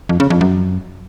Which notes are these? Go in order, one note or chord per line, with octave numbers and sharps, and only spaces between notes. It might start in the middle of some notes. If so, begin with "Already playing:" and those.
F2
C#3
F2
F#2